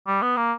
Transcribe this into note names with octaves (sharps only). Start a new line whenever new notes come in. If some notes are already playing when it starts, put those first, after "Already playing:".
G3
B3
A#3